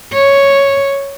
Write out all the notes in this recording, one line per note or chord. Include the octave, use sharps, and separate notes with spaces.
C#5